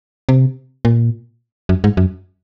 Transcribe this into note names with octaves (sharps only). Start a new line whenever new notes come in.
C3
A#2
F#2
G#2
F#2